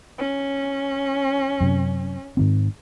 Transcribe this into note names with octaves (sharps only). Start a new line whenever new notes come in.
C#4
F#2 C3
G#2 D#3 C4